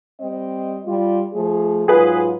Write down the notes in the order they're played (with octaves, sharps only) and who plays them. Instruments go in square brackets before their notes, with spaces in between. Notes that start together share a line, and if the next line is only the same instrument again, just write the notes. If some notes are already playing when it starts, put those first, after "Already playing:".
[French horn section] G3 C4 D#5
G3 F4
F3 A3 G#4
[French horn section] G#2 F#3 F4 [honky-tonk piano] G#4 B4